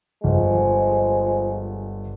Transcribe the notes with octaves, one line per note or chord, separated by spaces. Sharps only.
G1 F3 G#3